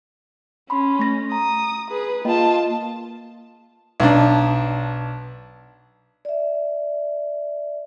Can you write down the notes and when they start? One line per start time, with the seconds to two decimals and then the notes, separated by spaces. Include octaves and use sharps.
0.70 C#4 B5 C6
0.99 A3 A#6
1.32 A#5 D#6
1.90 G#4 B4
2.25 A#3 F4 D#5 G5 A5
4.00 B1 D4
6.25 D5 E5